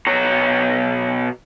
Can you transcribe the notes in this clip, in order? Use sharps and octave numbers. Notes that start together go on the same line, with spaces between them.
B2 C#5 A#5